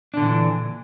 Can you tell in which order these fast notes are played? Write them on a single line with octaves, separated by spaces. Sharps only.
D4 D3 A#2 E3